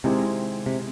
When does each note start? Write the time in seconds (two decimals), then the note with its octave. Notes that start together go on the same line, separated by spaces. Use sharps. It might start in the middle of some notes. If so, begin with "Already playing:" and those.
0.04 C3 D#3 G#3 C4 E4 G4
0.66 C3